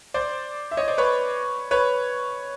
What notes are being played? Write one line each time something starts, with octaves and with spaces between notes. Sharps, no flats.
C5 D5
E5
C#5 D#5
C5 D5
B4 C#5
B4 C#5